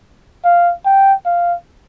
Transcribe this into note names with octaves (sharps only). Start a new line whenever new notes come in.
F5
G5
F5